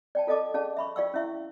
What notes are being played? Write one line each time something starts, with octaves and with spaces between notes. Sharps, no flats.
D5 G5 A5
F4 A4 D5 D#5 A5 D6
C#4 G#4 D5 F5 A5
E5 B5 C#6
F4 D5 F5 G5 C#6 E6
C#4 E4 E5 C#6